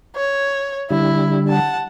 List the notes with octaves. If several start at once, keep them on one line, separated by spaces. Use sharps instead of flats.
C#5
D3 G3 E4
F#5 A5